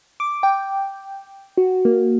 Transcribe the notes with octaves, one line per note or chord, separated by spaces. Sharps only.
D6
G5
F#4
A#3